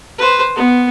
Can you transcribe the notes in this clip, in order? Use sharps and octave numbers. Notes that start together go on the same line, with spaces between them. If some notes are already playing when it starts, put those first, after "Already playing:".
B4 C5
B3